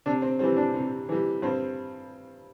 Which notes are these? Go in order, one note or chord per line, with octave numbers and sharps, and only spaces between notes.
C3 D4
C4
E3 G3 C4
D4
C3
E3 G3
G2 C4